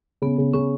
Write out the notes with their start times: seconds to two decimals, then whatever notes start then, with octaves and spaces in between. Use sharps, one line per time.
0.22 C#3 B3
0.38 C#3
0.53 C#3 C#4